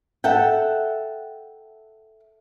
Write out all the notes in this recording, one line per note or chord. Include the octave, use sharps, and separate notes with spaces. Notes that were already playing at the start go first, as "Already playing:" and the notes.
A4 E5 F#5 G5